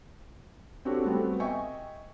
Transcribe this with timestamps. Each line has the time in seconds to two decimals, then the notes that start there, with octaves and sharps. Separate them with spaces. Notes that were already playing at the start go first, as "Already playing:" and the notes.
0.85 C4 D4 F#4 G4 A4 C#5
1.05 G3 A3 B3 C4 F#4 A4
1.40 D#5 E5 G5 G#5 C#6